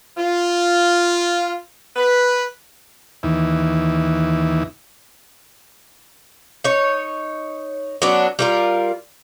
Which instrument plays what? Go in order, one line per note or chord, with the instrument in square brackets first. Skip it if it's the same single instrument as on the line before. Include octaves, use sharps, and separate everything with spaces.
[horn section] F4
B4
[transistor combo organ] D#2 E3
[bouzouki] D#4 C#5
F#3 B3 C#4 D4
G3 F4 A#4